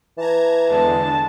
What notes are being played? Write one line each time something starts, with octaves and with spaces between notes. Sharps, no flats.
E3 A5 A#5 G#6
E2 D3 G#3 A5